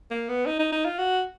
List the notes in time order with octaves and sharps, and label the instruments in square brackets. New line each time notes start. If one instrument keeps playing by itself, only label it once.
[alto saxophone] A#3
B3
D#4
D#4
D#4
F4
F#4